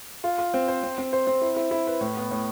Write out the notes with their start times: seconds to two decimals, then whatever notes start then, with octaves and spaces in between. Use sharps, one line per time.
0.24 F4
0.38 F4
0.54 C4
0.68 C5
0.83 C4
0.98 C4
1.13 C5
1.27 C4
1.42 E4
1.56 E4
1.71 E4
1.87 B4
2.01 A2
2.17 B3
2.31 A2